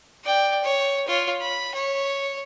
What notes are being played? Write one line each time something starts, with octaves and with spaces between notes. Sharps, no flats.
D5 G5
C#5
F4 C#5
B5
C#5